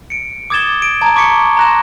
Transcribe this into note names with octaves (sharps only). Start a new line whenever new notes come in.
C#7 D7
D6 D#6 G#6 A6 E7 G7
D7
A5 A#5 G#6
C#6 D6 B6 C#7 G7
A#5 C6 F#6 A#6 E7